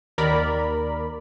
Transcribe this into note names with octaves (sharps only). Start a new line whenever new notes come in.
D#2 A#4 D5 B5